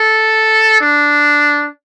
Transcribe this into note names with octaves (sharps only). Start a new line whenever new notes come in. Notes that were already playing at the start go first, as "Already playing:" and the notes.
Already playing: A4
D4